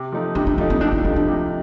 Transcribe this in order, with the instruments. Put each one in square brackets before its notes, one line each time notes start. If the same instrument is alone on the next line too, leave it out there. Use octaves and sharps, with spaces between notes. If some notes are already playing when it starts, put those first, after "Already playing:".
Already playing: [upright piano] C3
F3 A3 D#4
[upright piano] C3 [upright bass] D4
[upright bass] D4
[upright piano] F3 A3 D#4 [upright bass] D4
[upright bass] C4
[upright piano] C3 [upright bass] D4
[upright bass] D#4
[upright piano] F3 A3 D#4 [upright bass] D4
[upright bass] D4
[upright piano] C3